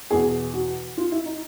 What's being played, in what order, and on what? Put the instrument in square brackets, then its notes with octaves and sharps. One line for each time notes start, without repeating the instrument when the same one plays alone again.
[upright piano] E2 B2 G#4
F#4
F4
E4
D#4